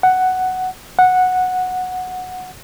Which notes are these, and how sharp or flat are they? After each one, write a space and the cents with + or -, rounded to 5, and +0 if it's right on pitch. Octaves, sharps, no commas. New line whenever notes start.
F#5 +5
F#5 -10